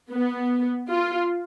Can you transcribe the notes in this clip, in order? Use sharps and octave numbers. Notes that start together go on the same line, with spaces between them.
B3
F4